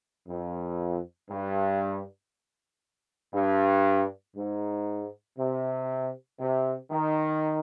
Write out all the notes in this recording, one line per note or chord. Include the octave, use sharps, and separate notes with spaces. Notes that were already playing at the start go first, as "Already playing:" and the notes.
F2
G2
G2
G#2
C3
C3
D#3